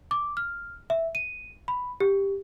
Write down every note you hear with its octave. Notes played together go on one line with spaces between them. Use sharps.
D6
F6
E5
D#7
B5
G4